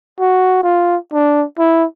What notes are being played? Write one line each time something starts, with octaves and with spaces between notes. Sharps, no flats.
F#4
F4
D4
E4